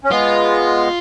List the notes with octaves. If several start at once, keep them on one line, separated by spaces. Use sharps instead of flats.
C#4
G#3 B3 F4